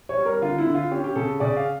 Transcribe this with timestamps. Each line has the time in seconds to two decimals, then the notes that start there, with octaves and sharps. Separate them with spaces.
0.09 C#5
0.17 G3
0.26 A#4
0.42 D3 F4
0.58 E4
0.67 D3
0.75 F4
0.91 C#4 G4
1.04 G4
1.16 C#3 A4
1.40 C#3 D5
1.57 F5